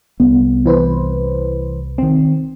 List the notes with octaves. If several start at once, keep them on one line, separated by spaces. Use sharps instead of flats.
C2 B3
E3 B4 C5
D#3 C4